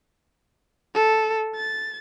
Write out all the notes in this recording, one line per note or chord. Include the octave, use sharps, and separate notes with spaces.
A4
A6